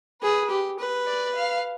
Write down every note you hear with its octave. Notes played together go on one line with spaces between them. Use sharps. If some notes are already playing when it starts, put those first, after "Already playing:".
G#4 B4
G4
B4
D5
F5